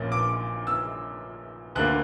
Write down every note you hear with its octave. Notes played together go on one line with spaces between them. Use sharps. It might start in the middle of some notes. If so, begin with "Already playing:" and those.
Already playing: A#1 A#2 A#3 C#4
D6
E6
D2 D3 A#3 F#6